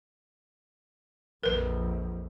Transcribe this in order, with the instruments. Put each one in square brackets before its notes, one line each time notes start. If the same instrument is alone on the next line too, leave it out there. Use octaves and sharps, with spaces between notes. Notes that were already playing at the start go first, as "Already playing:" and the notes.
[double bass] A#1 F2 [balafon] A#4 B4